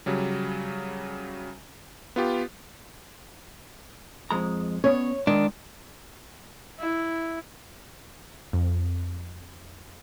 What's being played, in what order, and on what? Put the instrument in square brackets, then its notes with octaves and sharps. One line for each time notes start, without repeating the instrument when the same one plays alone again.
[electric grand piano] C#3 F#3 G3
B3 F4 G4
[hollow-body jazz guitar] F2 G#3 A#5
[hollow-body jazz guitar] B3 C#4 [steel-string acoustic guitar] C#5
[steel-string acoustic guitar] D#3 [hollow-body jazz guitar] G#3 [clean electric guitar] D4
[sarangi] E4
[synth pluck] F2